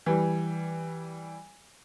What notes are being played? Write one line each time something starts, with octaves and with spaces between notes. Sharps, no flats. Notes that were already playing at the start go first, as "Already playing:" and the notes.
E3 G3